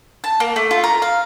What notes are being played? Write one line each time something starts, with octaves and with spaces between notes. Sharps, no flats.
A5
A#3
A3
F4
A#4
F5